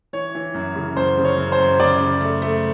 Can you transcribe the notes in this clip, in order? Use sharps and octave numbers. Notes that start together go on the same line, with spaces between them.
E3 C#5
E3
F#2
C#3
F#2 C5
C#3
C#5
F#2
C5
F#2
C#3 D5
C#3
A3
A3